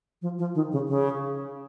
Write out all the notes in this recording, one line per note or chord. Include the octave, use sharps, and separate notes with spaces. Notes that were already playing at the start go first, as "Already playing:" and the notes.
F3
F3
D#3
C#3
C#3